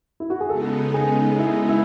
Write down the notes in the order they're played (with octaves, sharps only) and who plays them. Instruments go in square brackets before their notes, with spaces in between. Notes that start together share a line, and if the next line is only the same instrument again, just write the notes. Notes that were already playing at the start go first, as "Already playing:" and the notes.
[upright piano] E4
F#4
G#4
[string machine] C#3 G#3 B3 D#4 [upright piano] A4
[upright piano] G#4
E4
E4